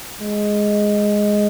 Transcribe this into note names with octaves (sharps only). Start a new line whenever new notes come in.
G#3